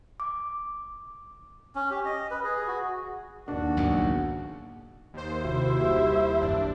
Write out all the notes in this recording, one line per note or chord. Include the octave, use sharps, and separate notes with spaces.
D6
C#4
G4
D#5
B4
G#4
F#4
D#2 D4 F#4
B1 G#2 C#3
D#2 C5
C3 E4 F#4 E5
D#3 G3 G4
A#1 F#2 D4